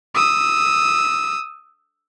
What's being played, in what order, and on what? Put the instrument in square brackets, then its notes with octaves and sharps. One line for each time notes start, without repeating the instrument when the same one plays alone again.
[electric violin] D#6 E6